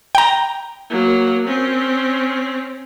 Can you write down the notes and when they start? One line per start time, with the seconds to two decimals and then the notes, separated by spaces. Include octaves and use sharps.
0.15 G5 A#5
0.90 F#3 A#3
1.47 C4 C#4